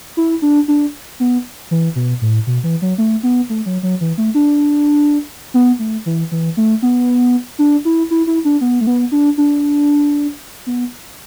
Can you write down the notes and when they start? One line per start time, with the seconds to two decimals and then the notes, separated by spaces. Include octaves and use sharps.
0.17 E4
0.42 D4
0.68 D4
1.20 B3
1.71 E3
1.96 B2
2.21 A2
2.47 B2
2.64 E3
2.82 F#3
2.98 A3
3.23 B3
3.50 A3
3.66 F#3
3.83 F#3
4.01 E3
4.18 A3
4.35 D4
5.54 B3
5.79 A3
6.06 E3
6.31 E3
6.57 A3
6.82 B3
7.59 D4
7.85 E4
8.11 E4
8.27 E4
8.45 D4
8.61 B3
8.81 A3
8.87 B3
9.12 D4
9.38 D4
10.66 B3